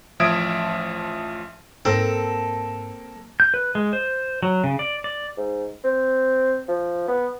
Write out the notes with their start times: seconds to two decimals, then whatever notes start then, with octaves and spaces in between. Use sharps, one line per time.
0.20 A1 F3 E5 D#6 G#6 D7
1.85 G#2 A#3 C4 A4 A#6
3.40 G6
3.54 B4
3.75 G#3
3.93 C5
4.43 F#3
4.64 C#3
4.79 D5
5.04 D5
5.37 G#2
5.84 C4
6.68 F3
7.08 B3